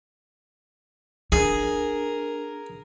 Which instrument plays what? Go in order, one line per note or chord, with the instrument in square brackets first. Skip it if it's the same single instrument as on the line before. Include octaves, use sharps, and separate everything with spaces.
[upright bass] D4 [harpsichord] G#4 [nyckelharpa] A#4